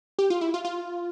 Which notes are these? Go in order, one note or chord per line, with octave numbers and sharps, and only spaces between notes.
G4
F4
E4
F4
F4